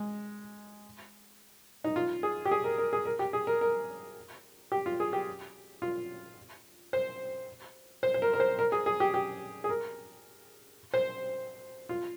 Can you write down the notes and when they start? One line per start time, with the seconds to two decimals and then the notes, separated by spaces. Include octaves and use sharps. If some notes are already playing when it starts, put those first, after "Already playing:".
Already playing: G#3
1.84 D#4
1.96 F4
2.23 G#4
2.45 G4
2.51 G#4
2.64 A#4
2.78 A#4
2.93 G#4
3.06 A#4
3.19 G4
3.33 G#4
3.47 A#4
3.61 A#4
4.72 G4
4.86 F4
5.00 G#4
5.13 G4
5.82 F4
6.93 C5
8.03 C5
8.14 C5
8.22 A#4
8.34 A#4
8.40 C5
8.59 A#4
8.72 G#4
8.86 G#4
9.00 G4
9.14 G4
9.64 G#4
9.69 A#4
10.94 C5
11.89 F4